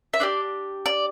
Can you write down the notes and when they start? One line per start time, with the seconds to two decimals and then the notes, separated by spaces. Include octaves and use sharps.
0.13 E5
0.20 D4 G4 D5
0.86 D5